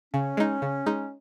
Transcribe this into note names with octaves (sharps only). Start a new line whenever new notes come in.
C#3 C#4
G#3 D#4
C#3
G#3 D#4